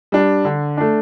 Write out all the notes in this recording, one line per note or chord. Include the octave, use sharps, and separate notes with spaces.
G3 D4
D3
A3 D4